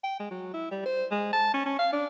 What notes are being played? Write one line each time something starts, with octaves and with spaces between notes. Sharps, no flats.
G5
G#3
F#3
E4
G3
C5
G#3
A5
C#4
C#4
F5
D4